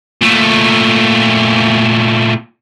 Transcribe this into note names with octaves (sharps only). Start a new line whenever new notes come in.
A#2 A3